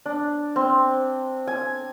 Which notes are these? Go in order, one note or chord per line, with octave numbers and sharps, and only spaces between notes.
D4
C4
G#5